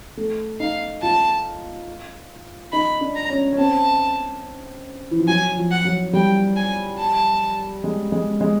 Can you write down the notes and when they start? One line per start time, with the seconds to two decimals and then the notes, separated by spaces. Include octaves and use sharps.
0.17 A3
0.60 D#4 F5
1.02 F4 A5
2.72 D#4 B5
3.01 D4
3.16 A#5
3.30 C#4
3.52 C#4
3.58 C4 A5
5.11 E3
5.19 F3
5.28 F#3 G#5
5.57 F3
5.71 F#5
5.85 F#3
6.13 G3 G5
6.56 G#5
6.99 A5
7.84 G#3
8.12 G#3
8.41 G#3